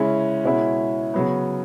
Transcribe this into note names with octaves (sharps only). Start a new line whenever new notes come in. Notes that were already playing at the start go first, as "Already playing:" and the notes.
Already playing: C#3 G#3 C#4 E4
B2 G#3 C#4 E4
C#3 F#3 B3